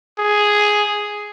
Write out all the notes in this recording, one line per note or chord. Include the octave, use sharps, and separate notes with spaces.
G#4